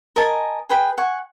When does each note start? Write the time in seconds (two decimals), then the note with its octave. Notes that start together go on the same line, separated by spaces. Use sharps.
0.16 A#4 D#5 G#5 A5
0.69 G#4 B4 G5 B5
0.98 F#5 G#5 C#6